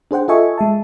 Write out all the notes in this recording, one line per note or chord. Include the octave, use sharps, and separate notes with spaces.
D4 G#4 C5 F#5 G5
F4 A4 D#5 E5 G#5 C#6
G#3 E5 A5